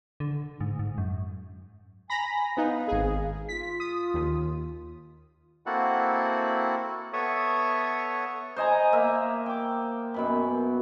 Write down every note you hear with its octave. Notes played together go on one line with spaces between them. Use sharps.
D3
G#2
G#2
F#2
G#5 A#5 B5 A#6
B3 D#4 F5
G#1 G#4
F4 B6
D#6
D#2
A#3 C4 E4 F#4 A4 F#5
B3 A4 C#5 E5 C#6 D#6
C5 D#5 G#5 A#5
A#3 E5
G5 D6
F#2 B2 B5